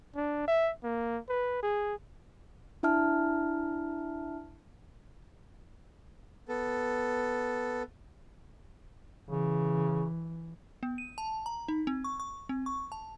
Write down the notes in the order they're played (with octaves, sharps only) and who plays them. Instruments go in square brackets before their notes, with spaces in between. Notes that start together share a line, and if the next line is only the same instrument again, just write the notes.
[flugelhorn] D4
E5
A#3
B4
G#4
[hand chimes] D4 E4 E5 A5 F6
[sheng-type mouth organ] B3 A4
[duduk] C#3 [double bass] E3
[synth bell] B3
D#7
A5
A#5
D#4
C4
C#6
C#6
C4
C#6
A5